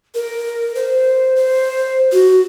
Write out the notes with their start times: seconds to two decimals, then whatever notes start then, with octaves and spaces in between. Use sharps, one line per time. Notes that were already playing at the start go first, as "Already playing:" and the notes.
0.15 A#4
0.75 C5
1.36 C5
2.12 F#4